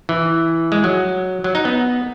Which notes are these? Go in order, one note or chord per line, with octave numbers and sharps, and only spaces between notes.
E3
G#3
F#3
F#3
D#4
B3